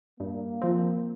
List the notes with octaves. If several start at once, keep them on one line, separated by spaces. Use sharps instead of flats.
G2 A#3
F3 C4